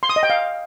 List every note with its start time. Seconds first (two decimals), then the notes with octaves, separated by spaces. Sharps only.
0.03 C6
0.09 D#6
0.16 D#5
0.23 G5
0.30 F5